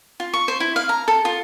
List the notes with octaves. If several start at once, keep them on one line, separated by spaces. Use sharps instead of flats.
F4
C#6
C5
E4
F5
A#5
A4
F4